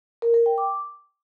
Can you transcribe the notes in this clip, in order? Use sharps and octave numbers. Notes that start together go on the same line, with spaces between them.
A#4
A#4
G5
D6